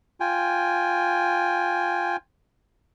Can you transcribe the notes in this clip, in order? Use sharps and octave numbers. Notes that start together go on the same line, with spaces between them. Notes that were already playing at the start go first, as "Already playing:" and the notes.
F4 G5 G#5